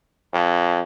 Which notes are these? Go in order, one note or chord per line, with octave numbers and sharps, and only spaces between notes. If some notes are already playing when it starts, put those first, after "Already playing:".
F2